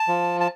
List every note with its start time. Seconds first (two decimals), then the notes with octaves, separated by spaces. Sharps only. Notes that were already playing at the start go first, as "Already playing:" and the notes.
Already playing: A5
0.08 F3
0.41 A5